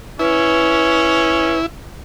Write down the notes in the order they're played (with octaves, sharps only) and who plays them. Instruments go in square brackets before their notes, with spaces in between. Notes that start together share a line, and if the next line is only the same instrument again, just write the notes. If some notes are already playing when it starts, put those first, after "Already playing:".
[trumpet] C#4 [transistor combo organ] E4 [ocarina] B4